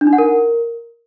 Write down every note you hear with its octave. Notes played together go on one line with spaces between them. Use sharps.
D4
D#4
F#5
A#4